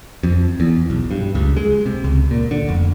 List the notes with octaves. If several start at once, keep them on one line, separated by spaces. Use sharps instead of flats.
F2
E2
B1
G2
C#2
G#3
C3
C#2
A#2
D3
F1